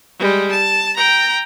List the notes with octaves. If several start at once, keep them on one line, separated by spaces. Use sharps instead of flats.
G3 G#3
A5
G5 A#5